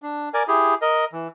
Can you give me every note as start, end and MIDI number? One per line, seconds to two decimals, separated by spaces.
0.02 0.29 62
0.34 0.43 70
0.34 0.43 74
0.34 0.43 80
0.48 0.74 64
0.48 0.74 67
0.48 0.74 68
0.82 1.05 70
0.82 1.05 75
1.12 1.28 52